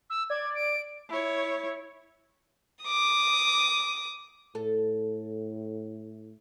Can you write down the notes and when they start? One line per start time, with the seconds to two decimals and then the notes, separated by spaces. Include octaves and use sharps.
0.10 E6
0.30 D5 G#6
0.55 D7
1.09 E4 C#5
2.84 D6 D#6
4.55 A2 A4